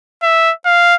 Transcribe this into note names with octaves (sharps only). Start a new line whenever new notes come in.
E5
F5